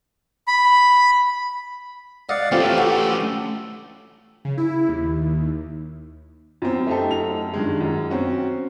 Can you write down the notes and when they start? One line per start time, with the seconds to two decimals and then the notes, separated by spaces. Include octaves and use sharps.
0.47 B5
2.29 D5 D#5 F5 F#5
2.52 A3 C4 C#4 F4 G4 A4
2.78 F#4
4.45 C#3
4.58 E4
4.89 D#2
6.62 F#2 C4
6.87 A3 D#4 G4 A4
7.11 F#2 F7
7.54 G2 D#3 G#3
7.80 F#2
8.10 C4 C#4 F#4